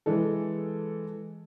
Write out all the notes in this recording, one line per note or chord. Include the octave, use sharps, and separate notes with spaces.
E3 G#3 A4